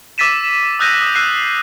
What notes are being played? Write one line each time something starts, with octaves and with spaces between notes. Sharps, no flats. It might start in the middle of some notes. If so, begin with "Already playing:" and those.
D6 E6 A6 B6 D#7 E7
D#6 E6 F#6 G6 A#6 D#7
D#6
E6 F#6 C7 D#7